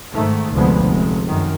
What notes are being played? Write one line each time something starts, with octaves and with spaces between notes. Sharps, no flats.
G#2 D#3 A3
F1 D2 F3 G#3 B3
F1 G#3
F#2 D#3